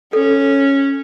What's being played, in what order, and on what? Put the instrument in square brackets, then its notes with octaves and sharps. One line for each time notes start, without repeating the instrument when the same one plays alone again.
[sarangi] C#4 [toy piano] A4